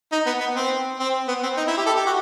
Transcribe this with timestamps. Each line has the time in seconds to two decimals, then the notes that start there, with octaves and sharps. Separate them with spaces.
0.12 D#4
0.26 B3
0.41 B3
0.56 C4
1.00 C4
1.28 B3
1.43 C4
1.57 D#4
1.67 E4
1.77 G4
1.86 A4
1.97 G4
2.06 F#4